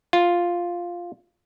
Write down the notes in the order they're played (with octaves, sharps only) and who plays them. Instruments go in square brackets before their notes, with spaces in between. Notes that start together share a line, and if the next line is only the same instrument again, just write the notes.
[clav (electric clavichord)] F4